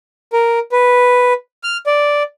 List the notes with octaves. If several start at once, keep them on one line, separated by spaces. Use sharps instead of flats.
A#4
B4
F6
D5